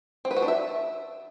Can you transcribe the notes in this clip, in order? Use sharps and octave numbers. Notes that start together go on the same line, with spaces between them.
C4
B4
F#4
D4
E5